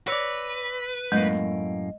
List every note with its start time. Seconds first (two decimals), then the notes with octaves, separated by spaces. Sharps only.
0.08 B4 C#5 D5 E6 A#6 F7
1.12 F#2 A2 G#3 A#3 D#5